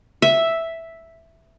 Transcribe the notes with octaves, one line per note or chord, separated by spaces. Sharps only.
E5